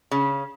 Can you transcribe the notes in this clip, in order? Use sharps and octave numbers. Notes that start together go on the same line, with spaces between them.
C#3